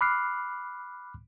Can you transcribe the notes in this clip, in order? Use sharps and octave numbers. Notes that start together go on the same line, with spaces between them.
B5 D6 F6 F#6 C7